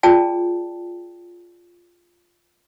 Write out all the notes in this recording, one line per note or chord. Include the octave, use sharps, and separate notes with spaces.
F4 G#4 D5 G5 A5